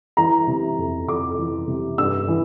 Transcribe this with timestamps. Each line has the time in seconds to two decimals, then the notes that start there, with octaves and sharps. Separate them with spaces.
0.17 E3 A#5
0.47 C3
0.78 F2
1.08 F2 D6
1.39 E3
1.68 C3
1.98 G2 E6
2.28 E3